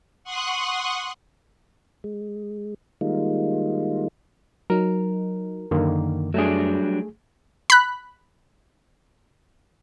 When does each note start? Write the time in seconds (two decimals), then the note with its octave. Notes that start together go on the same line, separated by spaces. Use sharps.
0.24 F#5 C6 C#6 D#6 F#6
2.04 G#3
3.01 D#3 G3 G#3 A#3 D#4 F4
4.70 F#3 D#4 A#4
5.71 F#2 D3 D#3 A#3
6.34 F#3 G3 A3 D4 G#4
7.70 B5 F#6